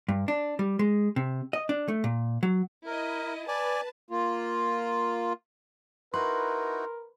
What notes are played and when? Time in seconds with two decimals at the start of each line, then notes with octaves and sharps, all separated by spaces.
0.09 G2
0.28 D4
0.59 G3
0.79 G#3
1.16 C3
1.53 D#5
1.69 D4
1.88 A3
2.04 A#2
2.43 F#3
2.86 E4 A#4 D#5
3.48 B4 D5 G#5 A5
4.10 A#3 F4
6.14 D#4 E4 F#4 A#4 B4 C6